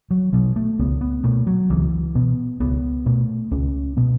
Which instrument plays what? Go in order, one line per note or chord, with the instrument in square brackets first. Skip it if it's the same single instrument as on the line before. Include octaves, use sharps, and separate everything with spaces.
[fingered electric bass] F#3
B2 F#3
A3
C#2 B3
B3
B2 A3
F#3
C#2 E3
B2 B3
C#2 B3
B2 A3
C#2 C#4
B2 B3